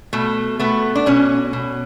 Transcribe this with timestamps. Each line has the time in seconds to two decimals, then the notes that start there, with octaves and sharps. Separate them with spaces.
0.13 B2 A3
0.59 A3 B3
0.95 D4
1.06 B2 C#4
1.53 B2